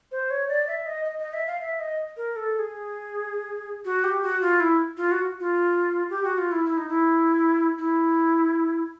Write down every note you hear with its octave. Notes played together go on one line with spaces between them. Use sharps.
C5
C#5
D5
E5
D#5
D#5
D#5
E5
F5
E5
D#5
A#4
A4
A4
G#4
F#4
G4
F#4
F4
E4
F4
F#4
F4
G4
F#4
F4
E4
E4
D#4
E4
E4